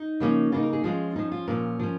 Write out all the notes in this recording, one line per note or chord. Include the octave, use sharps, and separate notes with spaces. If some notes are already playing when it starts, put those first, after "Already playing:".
Already playing: D#4
C#3 F3 A#3 C#4
C#3 A#3 D#4 F4
A#4
G#4
F3 G#3 C#4 F4
F3 C#4 D#4
F4
A#2 F3 C#4 A#4
F3 C#4